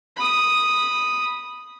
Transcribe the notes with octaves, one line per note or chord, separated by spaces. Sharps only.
B5 D#6